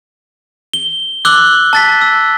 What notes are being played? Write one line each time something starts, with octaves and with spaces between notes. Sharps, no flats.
G7
D6 E6 F#6 F#7 G7
A5 A6 B6
E6